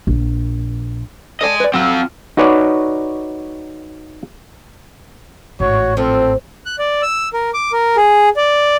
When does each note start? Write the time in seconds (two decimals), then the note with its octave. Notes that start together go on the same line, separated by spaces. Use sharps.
0.07 A#1
1.41 A4 D5 D#5 G#5 A5
1.60 B4 D5
1.74 F#3 C4 F4
2.37 D#4 F#4 B4 C#5 D5
5.60 A1 G#2 F#4 C#5
5.97 F3 C4 A4
6.66 F#6
6.79 D5
7.02 E6
7.33 A#4
7.54 D6
7.73 A#4
7.97 G#4
8.37 D5